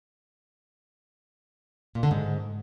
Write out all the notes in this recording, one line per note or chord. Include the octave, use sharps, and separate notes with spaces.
A#2
D3
G#2